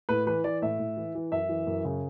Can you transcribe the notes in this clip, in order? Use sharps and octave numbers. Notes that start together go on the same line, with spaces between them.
A2 B4
E3 B4
E3 D5
A2 E5
A2
E3
E3
F#2 E5
E3
F#2
C#3